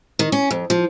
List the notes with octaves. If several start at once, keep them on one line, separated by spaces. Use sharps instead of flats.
D#3
C#4
F2
F3